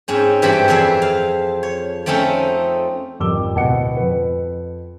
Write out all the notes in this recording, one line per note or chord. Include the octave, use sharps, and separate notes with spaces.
G#2 C4 C#4
G2 E3 G3 C4 C5 B5
F2 E3 F3 G#4 E5
F5
C#5
F3 A3 C4 C#4 D#4
G#1 F2 G3 D6 E6 G7
D1 B2 F#5 C#7
F2 B4